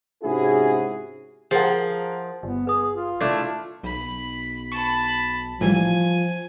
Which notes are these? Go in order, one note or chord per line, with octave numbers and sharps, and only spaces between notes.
G#2 C3 C#4 E4 F#4 G#4
F3 G#4 A#4 F#5
G1 B3
G#4 B4 D#6
F4
A3 D4 E4 D5
B1 B5
A5 B5 C#6
A2 E3 F3 G3 G#5